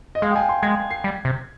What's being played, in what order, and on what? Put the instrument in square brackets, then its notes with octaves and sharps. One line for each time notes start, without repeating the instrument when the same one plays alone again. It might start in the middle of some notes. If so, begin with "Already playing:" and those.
[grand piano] D#5
[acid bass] G#3 [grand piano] F5
[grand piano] G5
G#5
C6
[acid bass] G#3 [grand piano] G#6
[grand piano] C7
[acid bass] G3
C3